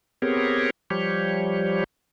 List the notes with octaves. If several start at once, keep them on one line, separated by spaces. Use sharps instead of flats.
B3 C4 G4 G#4 A#4 C#5
F3 G3 G4 C#5